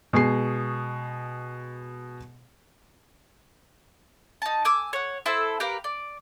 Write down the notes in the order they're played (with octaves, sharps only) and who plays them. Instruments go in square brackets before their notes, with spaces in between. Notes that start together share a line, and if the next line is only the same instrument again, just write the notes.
[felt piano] B2 G#3 G#4 C#6 C7
[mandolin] D#4 A5
G#5 D6 E6
C#5 F#5
E4 A4 C5 E6
G4 A#4 B4 F5
D5